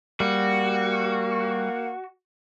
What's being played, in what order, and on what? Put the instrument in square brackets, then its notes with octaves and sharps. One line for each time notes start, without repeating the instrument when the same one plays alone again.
[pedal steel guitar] G3 [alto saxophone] A#3 [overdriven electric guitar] F#4